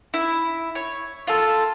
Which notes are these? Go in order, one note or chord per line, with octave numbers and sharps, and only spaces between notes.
E4
C#5
F4 A4